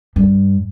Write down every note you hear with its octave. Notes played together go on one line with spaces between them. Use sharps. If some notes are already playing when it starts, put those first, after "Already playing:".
G2